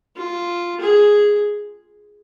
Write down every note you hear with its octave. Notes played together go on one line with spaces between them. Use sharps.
F4
G#4